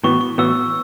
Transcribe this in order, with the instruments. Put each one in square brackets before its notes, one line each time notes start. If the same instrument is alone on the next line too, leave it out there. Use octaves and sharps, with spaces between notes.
[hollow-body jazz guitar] A2 E3 B3 F#4 [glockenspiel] C#6
[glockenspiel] C#6
[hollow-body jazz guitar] A2 E3 B3 F#4 [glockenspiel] E6